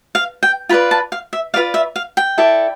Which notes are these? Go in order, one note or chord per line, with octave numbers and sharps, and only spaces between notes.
F5
G5
F4 B4 D5 B5
A5
F5
E5
F4 B4 D5 F5
E5
F5
G5
E4 A4 D5